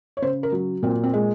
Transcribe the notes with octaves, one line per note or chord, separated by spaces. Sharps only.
C#5
C#3 C5
A#4
F#3
A#2 C4
C4
G#3